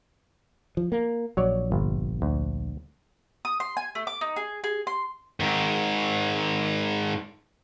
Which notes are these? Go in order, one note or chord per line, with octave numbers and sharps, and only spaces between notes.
F3
A#3
A#1 F#3 C#5 D5
G1
D2
D#6
C6
G#5
A3
D6
D#4
G#4
G#4
C6
G#2 D#3